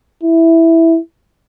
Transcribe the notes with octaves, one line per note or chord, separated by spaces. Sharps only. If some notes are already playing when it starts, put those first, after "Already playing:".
E4